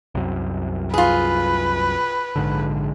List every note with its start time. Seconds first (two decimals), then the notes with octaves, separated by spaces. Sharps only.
0.15 C2 F#2
0.94 F4 G#4 B4
2.36 A#1 G#2 D3